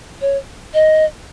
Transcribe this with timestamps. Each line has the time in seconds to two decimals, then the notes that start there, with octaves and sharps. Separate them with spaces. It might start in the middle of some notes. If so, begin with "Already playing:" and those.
0.21 C#5
0.74 D#5